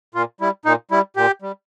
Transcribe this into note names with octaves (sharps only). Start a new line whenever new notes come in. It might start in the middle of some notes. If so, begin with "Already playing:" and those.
A#2 F4
G3 E4
A#2 D#4
G3 E4
A#2 G4
G3